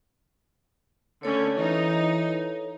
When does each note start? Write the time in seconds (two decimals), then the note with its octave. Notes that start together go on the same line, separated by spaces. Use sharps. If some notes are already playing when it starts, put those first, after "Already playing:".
1.23 D3 A3 C#4 A4 C#5
1.57 E3 D#4